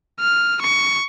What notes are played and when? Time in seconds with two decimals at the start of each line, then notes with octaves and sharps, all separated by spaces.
0.20 F6
0.61 C#6